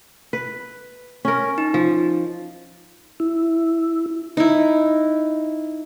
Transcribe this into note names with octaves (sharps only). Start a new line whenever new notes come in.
B4
C#4 A#4
D#4
F3
E4
D#4 E4